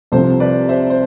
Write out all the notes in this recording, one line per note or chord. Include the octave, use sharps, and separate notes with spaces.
C2 C3 F3 A4 C5
B4 D5
C5 E5
C5